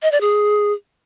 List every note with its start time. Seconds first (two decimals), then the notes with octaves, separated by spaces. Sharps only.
0.02 D#5
0.12 D5
0.21 G#4